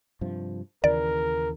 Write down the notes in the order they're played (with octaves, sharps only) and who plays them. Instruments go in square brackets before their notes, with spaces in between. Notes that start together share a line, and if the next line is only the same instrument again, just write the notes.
[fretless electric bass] G2 C3 F3
[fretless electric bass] D#2 C#3 E3 [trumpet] A#4 [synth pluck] D5